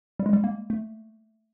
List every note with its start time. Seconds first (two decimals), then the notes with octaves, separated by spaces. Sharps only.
0.20 G3
0.26 G#3
0.33 G3
0.44 A#3
0.70 A3